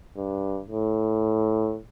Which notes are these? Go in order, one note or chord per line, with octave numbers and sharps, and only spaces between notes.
G2
A2